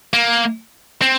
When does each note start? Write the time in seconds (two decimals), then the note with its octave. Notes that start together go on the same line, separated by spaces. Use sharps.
0.14 A#3
1.02 C4